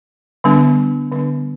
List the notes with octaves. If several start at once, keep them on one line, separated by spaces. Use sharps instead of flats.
D3 G3 B3 D4
D3 G3 B3 D4